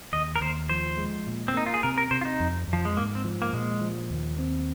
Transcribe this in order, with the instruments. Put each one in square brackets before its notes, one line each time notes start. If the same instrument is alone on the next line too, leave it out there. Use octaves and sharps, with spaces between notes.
[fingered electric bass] D#2 [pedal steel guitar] D#5
[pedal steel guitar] A#4
[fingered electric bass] D#2 [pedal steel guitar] C5
[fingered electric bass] F3 [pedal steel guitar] C5
[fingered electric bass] G#3
A#2
[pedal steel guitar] C4
[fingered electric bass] A#3 [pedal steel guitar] D#4
[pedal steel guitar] F4
G#4
[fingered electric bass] C3 [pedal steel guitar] A#4
[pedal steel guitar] A#4
[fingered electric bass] C3 [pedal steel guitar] C5
[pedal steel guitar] F4
D#4
[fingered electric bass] F2
F2
[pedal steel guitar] F3
G#3
[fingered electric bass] G#2 [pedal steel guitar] A#3
[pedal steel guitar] C4
[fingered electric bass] F3
[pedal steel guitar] A#3
[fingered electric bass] A#2 [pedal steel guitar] G#3
[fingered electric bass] F3
D#2
C4